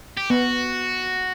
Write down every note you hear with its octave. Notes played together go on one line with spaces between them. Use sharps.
G4
B3 F#4